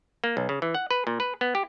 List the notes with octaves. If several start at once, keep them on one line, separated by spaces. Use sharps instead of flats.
A#3
B1
C#3
E3
F#5
B4
A#2
B4
B3
G4